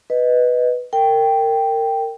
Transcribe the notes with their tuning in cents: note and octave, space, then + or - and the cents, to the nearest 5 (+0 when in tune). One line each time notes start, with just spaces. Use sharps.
B4 +0 D#5 +0
A#4 -25 G5 +0